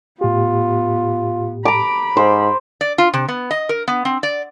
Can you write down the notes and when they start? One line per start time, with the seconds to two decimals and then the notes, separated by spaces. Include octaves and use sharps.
0.21 A2 B3 F4 G4
1.65 A#5 B5 D6
2.17 G#2 C5
2.81 D5
2.98 F4
3.14 C3
3.28 B3
3.51 D#5
3.69 A#4
3.88 B3
4.05 C4
4.23 D5